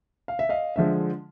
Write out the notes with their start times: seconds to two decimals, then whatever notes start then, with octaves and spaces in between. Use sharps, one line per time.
0.28 F5
0.39 E5
0.49 D#5 F5
0.76 D3 F3 G#3 E5